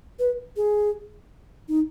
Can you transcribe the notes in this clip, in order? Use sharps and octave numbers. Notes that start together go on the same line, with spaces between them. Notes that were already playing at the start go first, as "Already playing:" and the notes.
B4
G#4
D#4